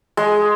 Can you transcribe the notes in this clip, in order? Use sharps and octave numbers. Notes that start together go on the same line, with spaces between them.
G#3